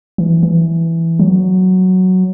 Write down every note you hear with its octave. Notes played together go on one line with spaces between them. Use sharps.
E3
E3
F#3